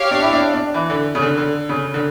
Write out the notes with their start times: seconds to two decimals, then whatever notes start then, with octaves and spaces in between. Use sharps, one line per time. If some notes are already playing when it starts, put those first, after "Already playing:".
Already playing: G4 C#5 F5
0.11 D4
0.22 E4
0.33 D4
0.54 D4
0.74 E3
0.90 D3
1.15 C#3
1.22 D3
1.37 D3
1.69 C#3
1.94 D3